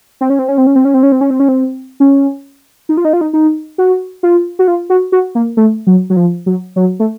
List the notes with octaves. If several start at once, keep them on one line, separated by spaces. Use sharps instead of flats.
C4
C#4
C4
C#4
C4
C#4
C4
C#4
C4
C#4
C4
C#4
C4
C#4
C4
C#4
D#4
F4
D#4
F4
D#4
D#4
F#4
F4
F#4
F4
F#4
F#4
A#3
A3
F#3
F#3
F3
F#3
F#3
A3